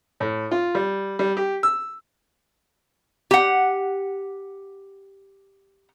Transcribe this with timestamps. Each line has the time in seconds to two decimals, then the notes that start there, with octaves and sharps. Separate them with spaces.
0.20 A2
0.51 F4
0.75 G3
1.19 G3
1.37 G4
1.63 E6
3.31 G4 F#5